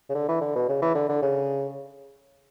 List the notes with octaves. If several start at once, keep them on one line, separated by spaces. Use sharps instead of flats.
C#3
D3
E3
D3
B2
C#3
E3
D3
D3
C#3